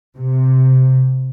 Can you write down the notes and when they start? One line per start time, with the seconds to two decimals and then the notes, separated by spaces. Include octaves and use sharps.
0.17 C3